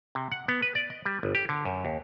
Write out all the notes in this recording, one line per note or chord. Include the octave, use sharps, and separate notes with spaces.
C3
F#5
B3
B4
D5
D#5
G3
G1
G4
D3
F#2
D#2